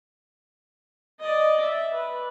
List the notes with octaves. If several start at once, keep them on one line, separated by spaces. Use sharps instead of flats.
D5 D#5
E5
B4